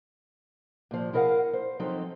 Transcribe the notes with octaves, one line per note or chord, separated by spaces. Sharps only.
A#2 F3
E4 G#4 A#4 D5 F5 F#5
C5
F3 F#3 C4 D#4 A4